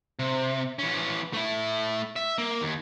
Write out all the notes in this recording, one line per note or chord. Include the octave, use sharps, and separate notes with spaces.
C3
E3 C#4
A3 E4
E5
A#3
D#2